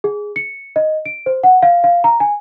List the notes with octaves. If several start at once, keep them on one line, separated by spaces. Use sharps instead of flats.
G#4
C#7
D#5
D7
C5
F#5
F5
F5
A#5
G#5